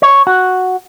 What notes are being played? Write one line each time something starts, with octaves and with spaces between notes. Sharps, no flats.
C#5
F#4